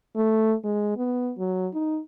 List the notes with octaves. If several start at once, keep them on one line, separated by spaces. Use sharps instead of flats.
A3
G#3
B3
F#3
D#4